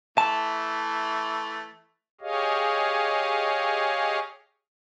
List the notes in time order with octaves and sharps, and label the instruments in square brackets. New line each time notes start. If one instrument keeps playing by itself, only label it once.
[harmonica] E3 A3 [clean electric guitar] A5
[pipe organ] G4 G#4 C#5 D#5 F5